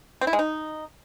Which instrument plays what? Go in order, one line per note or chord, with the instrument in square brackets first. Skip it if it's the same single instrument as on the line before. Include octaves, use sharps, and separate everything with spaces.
[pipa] C4
E4
G#3
D#4